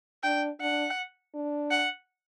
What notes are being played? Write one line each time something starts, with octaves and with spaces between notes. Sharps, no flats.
D4 G5
D4 F#5
D4
F#5